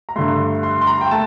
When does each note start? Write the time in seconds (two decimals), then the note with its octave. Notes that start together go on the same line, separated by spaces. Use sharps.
0.09 A#5
0.16 G2 D3 A3 C6
0.63 C6
0.82 C6
0.87 A#5
1.01 G5
1.11 A3 A5